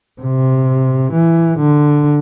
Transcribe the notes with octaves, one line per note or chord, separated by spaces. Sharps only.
C3
E3
D3